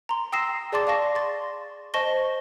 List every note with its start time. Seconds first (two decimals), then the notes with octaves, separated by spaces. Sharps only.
0.09 A#5 C6
0.32 G5 D#6 E6 A#6 C7 E7
0.72 G#4 D5 A5 C6 D6 A6
0.87 D5 F5 A5 C#6 A#6
1.15 C6 A6
1.94 C5 D#5 A5 C#6 A#6 G7